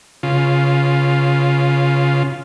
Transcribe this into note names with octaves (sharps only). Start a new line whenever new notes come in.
C#3 F4